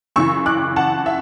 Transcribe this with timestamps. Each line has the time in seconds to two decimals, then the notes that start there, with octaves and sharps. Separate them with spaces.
0.16 F#2 C#3 E3 C#6 E6
0.46 D6 F#6
0.76 F#5 A5
1.06 E5